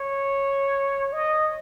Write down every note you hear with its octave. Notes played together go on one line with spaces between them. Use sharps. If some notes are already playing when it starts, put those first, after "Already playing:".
Already playing: C#5
D#5